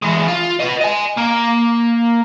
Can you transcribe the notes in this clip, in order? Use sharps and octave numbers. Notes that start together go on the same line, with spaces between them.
E3 G#3
F4
B4 D#5
D#5 G#5
A#3